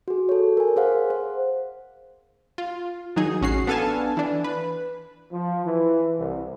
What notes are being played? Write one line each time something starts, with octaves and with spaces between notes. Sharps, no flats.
F#4 G#4
A4 C#5
A#4 G#5
G#4 C5 F5 F#5
C5
F4
D#3 F#3 D#4 G#4
A1 C#4 F#4 C7
B3 D4 A4 F5 G#5 A5
E3 D4
B4
F3
E3
C2